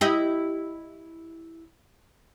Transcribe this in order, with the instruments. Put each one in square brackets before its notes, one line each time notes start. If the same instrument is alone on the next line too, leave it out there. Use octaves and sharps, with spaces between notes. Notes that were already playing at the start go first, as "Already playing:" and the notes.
[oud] E4 G4 D#5